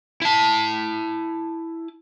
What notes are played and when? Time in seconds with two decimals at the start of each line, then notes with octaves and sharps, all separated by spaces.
0.22 E4 A5